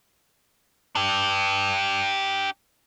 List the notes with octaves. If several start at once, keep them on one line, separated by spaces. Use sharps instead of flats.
D4 G4